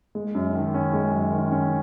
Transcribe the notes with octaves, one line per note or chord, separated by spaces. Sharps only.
G#3
F#2
D#3
C#4
G#3
F#2
D#3
C#4